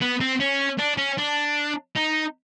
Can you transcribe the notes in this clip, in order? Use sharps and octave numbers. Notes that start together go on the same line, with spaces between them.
B3
C4
C#4
D4
C#4
D4
D#4